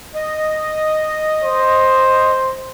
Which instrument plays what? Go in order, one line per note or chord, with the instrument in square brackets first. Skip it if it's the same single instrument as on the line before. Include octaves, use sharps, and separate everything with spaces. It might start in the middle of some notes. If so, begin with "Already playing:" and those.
[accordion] D#5
[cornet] C5